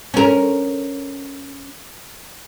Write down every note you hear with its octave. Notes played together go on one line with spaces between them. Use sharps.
C#4 A#4